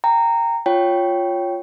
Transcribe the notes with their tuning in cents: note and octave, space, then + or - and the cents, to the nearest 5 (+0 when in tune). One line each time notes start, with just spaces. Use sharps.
G5 +0 A#5 -15
F4 +5 C#5 +0 G5 -10